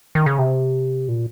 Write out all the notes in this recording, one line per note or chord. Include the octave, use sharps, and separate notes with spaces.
D#3
C#3
C3
A#2